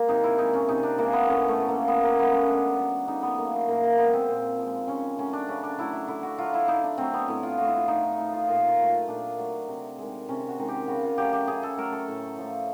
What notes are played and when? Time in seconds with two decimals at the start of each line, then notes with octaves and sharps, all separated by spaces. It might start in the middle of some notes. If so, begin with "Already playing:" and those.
Already playing: G#3 A#3
0.08 C3 D#4
0.23 E4
0.38 E3 G#3 D#4
0.54 C#4
0.68 C3 D#4
0.83 D4
0.98 E3 G#3 A#3
1.13 B3
1.28 A2 C#4
1.48 A3
1.58 F#3 A3
1.68 A#3
1.88 A2 B3
2.04 A#3
2.19 F#3 A3 B3
2.33 C#4
2.48 C#3 D4
2.78 F#3 A3
3.08 C#3 D#4
3.23 B3
3.38 F#3 A3 A#3
3.53 A3
3.68 A#2 A#3
3.84 A#3
3.98 F3 G#3 B3
4.13 C4
4.28 A#2
4.58 F3 G#3
4.88 C#3 C#4
5.18 F#3 A3 C#4
5.33 D4
5.48 C#3 C#4
5.63 D4
5.78 F#3 A3 E4
5.93 E4
6.08 D3 E4
6.23 F#4
6.38 F#3 A3 F4
6.54 E4
6.68 D3 D#4
6.84 D4
6.98 F#3 A3 C4
7.14 B3
7.28 A2 E4
7.43 F4
7.58 F3 A3 F#4
7.67 E4
7.74 F4
7.88 A2 D#4
8.03 D#4
8.18 F3 A3 D#4
8.33 F4
8.48 A#2 F4
8.68 F4
8.78 F#3 A3
8.88 F4
9.07 A#2 D4
9.38 F#3 A3
9.68 C3
9.98 D#3 G#3
10.28 C3 C#4
10.49 F#4
10.58 D#3 G#3
10.68 G4
10.88 C#3 F#4
11.03 F4
11.18 F#3 A3 G4
11.33 G4
11.47 C#3 G#4
11.63 A4
11.77 F#3 A3 A#4
11.92 A4
12.08 A2
12.39 F3 A3